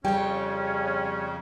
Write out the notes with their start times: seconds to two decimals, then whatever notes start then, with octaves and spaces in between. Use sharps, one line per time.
0.05 F2 C#3 G3 C#4 C#5 G5